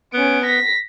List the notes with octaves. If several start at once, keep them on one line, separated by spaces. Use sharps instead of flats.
B3 C#4 D7
A#6 B6